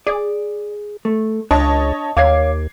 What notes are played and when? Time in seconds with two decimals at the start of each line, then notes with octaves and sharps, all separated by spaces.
0.07 G#4 D5
1.05 A3
1.51 C#2 D4 C#5 D#5 A5
2.17 D#2 C#5 F5 D6 G#6 C7